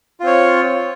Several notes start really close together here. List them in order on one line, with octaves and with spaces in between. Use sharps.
F4 C4 C#5